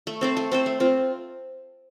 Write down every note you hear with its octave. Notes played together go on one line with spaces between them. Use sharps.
A3
C4 A4 C5
A3
C4 A4 C5
A3
C4 F4